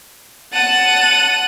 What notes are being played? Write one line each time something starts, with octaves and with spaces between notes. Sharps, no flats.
F#5 A5 D#7